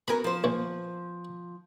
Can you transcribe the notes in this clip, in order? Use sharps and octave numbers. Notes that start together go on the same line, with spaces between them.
B3 F#4 A#4 G#5 B5
F3 C5
A#1 E3